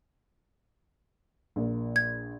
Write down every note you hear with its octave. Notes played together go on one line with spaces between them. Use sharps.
A#1 A#3
G#6